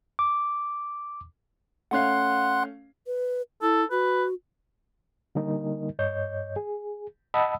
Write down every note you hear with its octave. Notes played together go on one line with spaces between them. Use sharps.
D6
A3 C#4 F5 F#5 C6 F#6
B4
E4 A4
F#4 B4
D3 G3 A#3 D#4 A#4 D#5
G2 C#5 D#5 G6
G#4
D#5 F#5 A5 B5 D#6 E6